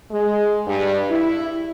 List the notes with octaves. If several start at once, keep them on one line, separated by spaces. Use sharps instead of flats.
G#3
G2
E4